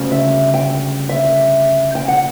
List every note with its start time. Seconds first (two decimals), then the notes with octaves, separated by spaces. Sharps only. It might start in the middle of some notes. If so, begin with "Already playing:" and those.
Already playing: D2 C#3 G3
0.12 E5
0.54 G5
1.09 E5
1.95 G5
2.08 F#5